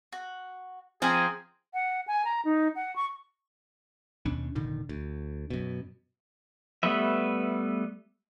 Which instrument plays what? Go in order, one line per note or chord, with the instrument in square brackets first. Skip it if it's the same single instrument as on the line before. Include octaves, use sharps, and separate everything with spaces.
[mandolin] F#4
[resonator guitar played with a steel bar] F3 C4 [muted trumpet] G#4 [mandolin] G#5 A#5
[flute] F#5
G#5
A#5
D#4
F#5
C#6
[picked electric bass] D#2 B2 C#4 D4
F1 A#2 D3 D#3
D2
F#2 B2
[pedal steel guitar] G3 A3 B3 B4 E5